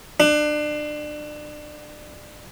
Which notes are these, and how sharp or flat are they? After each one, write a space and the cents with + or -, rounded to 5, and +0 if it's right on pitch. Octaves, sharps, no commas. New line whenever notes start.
D4 +30